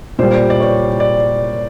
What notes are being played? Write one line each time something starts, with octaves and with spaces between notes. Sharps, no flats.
A#2 G3 C5
D5
C#5
D5